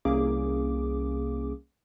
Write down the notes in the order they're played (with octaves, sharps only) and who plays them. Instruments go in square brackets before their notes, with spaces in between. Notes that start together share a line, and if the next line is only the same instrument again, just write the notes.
[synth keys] C2 A#3 C#4 G#4 D6